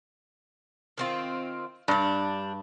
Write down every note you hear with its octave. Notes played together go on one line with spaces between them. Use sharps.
D#3 C4 F4
G2 G3 D4